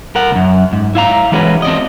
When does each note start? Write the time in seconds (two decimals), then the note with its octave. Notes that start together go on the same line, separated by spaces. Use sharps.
0.15 A#4 F#5
0.31 C#2 F#2
0.73 G#2
0.95 E4 F5 A#5
1.32 E3 G#3 B3 C#4 F#4 B4
1.62 C4 D5 D#5